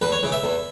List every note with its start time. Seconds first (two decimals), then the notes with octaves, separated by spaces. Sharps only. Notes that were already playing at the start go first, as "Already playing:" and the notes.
0.02 E2 B4
0.12 C#5
0.23 C#3 E3
0.32 E5
0.44 E2